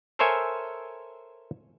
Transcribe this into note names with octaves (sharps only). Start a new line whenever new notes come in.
A4 A#4 C5 C#5 E5 G#5